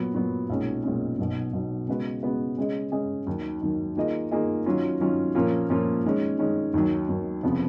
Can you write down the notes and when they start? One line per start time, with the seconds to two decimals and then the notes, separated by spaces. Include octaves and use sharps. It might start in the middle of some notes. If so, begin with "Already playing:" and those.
Already playing: A#2 F#3 B3
0.14 A#2 F#3 B3
0.50 B1 A#2 G#3 C#4
0.84 B1 A#2 G#3 C#4
1.19 B1 B2 F#3
1.53 B1 B2 F#3
1.88 C#3 G#3 B3 F#4 B4
2.23 C#3 G#3 B3 F#4 B4
2.57 C#3 G#3 C#4 G#4 D#5
2.92 C#3 G#3 C#4 G#4 D#5
3.27 D#2 D#3 F#3
3.62 D#2 D#3 F#3
3.96 D#3 A#3 F4 G#4 D#5
4.31 D#3 A#3 F4 G#4 D#5
4.66 D#3 F#3 C#4 F4
5.00 D#3 F#3 C#4 F4
5.35 A#2 F3 A#3 C#4 F4
5.70 A#2 F3 A#3 C#4 F4
6.04 D#3 G#3 C#4
6.39 D#3 G#3 C#4
6.74 D#2 D#3 F#3
7.08 D#2 D#3 F#3
7.43 F1 F2 C#3 F3 B3